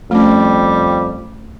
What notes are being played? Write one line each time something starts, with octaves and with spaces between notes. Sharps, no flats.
F2 G3 A3 C#4